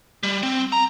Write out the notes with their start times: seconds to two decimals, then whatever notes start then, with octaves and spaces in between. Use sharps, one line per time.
0.23 G3
0.43 C4
0.72 A#5